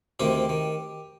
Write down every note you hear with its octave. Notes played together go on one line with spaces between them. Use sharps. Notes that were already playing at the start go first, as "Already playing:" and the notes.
D2 C3 D#3 G4
D#3